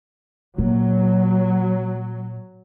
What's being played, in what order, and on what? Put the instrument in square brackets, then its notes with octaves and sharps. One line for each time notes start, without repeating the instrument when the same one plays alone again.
[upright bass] A#2 [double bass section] F#3